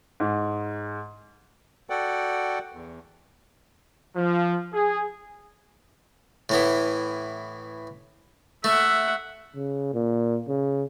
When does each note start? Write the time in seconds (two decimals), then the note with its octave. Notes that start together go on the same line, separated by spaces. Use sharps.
0.20 G#2
1.90 F#4 A4 D5 F#5 G5
2.72 E2
4.16 F3
4.74 G#4
6.49 A2 E3 B3
8.64 A3 E5 F#5
9.55 C#3
9.94 A#2
10.48 C#3